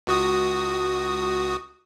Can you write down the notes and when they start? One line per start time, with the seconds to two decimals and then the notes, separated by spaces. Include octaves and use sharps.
0.07 C#2 F#4 D#6